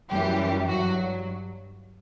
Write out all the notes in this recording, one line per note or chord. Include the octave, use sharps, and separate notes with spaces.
F#2 E3 G3 G4
G2 F#3 F#4